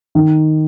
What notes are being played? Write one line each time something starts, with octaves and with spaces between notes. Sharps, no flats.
D#3